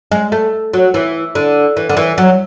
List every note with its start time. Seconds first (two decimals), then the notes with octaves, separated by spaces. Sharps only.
0.12 G#3
0.32 A3
0.73 F#3
0.94 E3
1.35 D3
1.77 E3
1.89 D3
1.97 E3
2.18 F#3